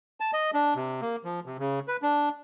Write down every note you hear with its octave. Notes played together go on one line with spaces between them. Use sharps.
A5
D#5
D4
C3
A#3
F3
C3
C#3
B4
D4